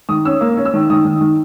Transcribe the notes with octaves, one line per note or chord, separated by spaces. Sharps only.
D#3 D#6
C#4 E6
A#3
C#4
E6
D#3
D#3 D#6
D#3
D#3